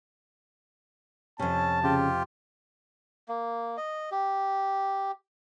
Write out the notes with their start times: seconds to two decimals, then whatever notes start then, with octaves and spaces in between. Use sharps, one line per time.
1.39 F2 C3 C#4 A5
1.83 C#3 F4 G4
3.28 A#3
3.77 D#5
4.11 G4